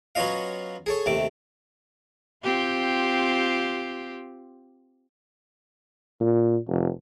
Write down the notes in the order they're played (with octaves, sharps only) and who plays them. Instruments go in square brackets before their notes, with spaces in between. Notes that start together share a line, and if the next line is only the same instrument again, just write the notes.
[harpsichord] F#3 B3 C#4 F4 D#5 F5
G#4 A4 C#5
D#2 C3 A3 D6
[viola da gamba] C4 F4 G4
[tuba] A#2
F1